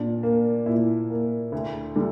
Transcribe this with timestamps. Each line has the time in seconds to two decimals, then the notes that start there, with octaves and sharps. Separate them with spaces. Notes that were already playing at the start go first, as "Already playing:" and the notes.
Already playing: A#2 D4
0.23 A#3
0.66 A#2 E4
1.10 A#3
1.52 D2
1.96 D3 G3